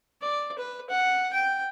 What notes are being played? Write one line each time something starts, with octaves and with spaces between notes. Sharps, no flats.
D5
B4
F#5
G5